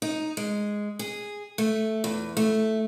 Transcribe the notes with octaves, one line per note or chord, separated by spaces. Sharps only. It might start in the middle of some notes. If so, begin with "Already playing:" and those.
D#4
G#3
G#4
A3
E2
A3